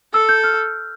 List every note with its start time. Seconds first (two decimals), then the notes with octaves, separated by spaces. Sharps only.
0.13 A4 E6
0.29 G6
0.44 F6